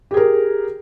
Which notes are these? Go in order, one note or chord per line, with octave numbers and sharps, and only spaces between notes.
G4 G#4 A#4